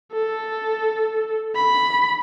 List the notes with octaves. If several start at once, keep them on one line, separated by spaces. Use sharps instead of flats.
A4
B5